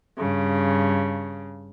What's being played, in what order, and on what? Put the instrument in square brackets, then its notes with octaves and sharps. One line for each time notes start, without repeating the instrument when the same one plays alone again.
[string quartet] G2 C#3